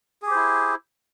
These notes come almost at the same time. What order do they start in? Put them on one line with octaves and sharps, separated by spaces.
G#4 G4 C5 E4